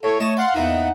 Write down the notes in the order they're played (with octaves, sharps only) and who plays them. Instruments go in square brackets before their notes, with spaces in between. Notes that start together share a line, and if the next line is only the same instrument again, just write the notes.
[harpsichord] A2 [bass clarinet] A4 [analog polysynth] C#5
[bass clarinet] A3 [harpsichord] D#5 A5
[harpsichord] D5 [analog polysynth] F5 F#5 C6
[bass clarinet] E2 [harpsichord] G#2 E3 A#3 [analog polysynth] D#4 F#5